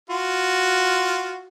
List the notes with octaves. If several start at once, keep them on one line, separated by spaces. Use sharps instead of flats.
F4 F#4